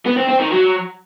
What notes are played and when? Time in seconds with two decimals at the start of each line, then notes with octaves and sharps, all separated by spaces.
0.06 B3
0.17 C4
0.29 C4
0.40 D#3
0.51 F#3